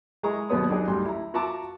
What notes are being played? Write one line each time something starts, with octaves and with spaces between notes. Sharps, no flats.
G#3 E4 G#4 A#5 C#6
D#2 B2 F#3 B3 C#5 D#6
F#3 D4 D#4 G4 G#4
A1 D2 G3 D#4 C6
E4 A#5
F4 F#4 E5 A5 A#5 D6